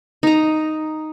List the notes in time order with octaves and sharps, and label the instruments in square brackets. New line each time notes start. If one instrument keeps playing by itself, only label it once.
[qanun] D#4 A#5